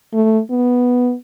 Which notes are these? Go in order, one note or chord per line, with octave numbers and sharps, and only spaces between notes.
A3
B3